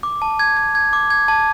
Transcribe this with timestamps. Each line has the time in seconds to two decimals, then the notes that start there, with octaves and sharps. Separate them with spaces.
0.03 D6
0.22 A5
0.39 G#6
0.57 G#6
0.75 G#6
0.93 D6
1.10 G#6
1.28 A5